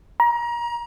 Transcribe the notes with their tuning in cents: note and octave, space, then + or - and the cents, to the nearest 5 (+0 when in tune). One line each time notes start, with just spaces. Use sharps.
A#5 +30